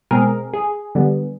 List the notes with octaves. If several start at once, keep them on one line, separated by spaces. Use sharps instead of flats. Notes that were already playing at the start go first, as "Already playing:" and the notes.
B2 G#3 C4 G#4 A#4
G#4
D3 G3 B3